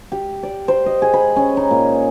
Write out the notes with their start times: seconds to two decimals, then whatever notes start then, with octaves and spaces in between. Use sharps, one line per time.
0.12 G4
0.43 D5
0.68 C5
0.86 D#5
1.02 G#4
1.14 B5
1.36 C#4
1.57 D#4
1.71 A#2